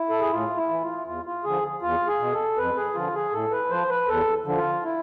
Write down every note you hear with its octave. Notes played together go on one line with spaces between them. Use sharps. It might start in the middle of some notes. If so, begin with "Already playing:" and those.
Already playing: E4
A4
G#4
A2 F4
E4
E3
F4
E2 F4
F4
D3 F3 G#4
E2 F4
G#4
B2
A4
F2 B4
G#4
D3 F3 F4
G#4
A2 A4
B4
F3 C5
B4
E2 A4
D3 F3
F4
E4